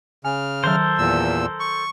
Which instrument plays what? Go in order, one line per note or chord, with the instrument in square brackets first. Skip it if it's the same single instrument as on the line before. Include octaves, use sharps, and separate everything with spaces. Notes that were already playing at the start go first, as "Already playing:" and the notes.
[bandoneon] C#3 F6 [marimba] G#5
[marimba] D#3 F#3 [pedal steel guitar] A4 A#4 C5
[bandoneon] E2 A#2 E6
C#6